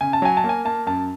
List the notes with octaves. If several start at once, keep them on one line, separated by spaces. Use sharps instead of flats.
C#3 G#5
A5
F#3 G#5
A5
A#3
G#5
A#3 A5
F#2 A5